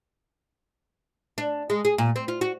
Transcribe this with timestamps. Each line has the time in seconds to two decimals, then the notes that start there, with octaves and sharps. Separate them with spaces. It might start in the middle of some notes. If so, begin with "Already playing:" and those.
1.38 D4
1.70 G#3
1.85 G#4
1.98 A#2
2.16 C4
2.28 F4
2.41 F#4